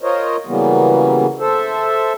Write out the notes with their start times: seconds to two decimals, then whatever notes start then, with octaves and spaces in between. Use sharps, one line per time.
0.02 F4 A#4 C5 C#5 D#5
0.47 C#3 E3 F#3 G3 A#3 B3
1.39 A4 C5 E5